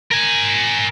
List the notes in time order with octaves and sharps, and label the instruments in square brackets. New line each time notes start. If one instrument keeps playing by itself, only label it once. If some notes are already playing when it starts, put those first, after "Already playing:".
[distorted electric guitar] A#4 G#5